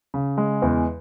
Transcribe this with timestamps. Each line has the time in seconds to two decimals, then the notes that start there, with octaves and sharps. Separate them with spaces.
0.14 C#3
0.37 G#3
0.62 E2